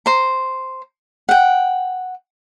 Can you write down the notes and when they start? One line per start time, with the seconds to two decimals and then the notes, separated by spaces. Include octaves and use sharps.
0.06 C5 A#5
1.29 F#5 G5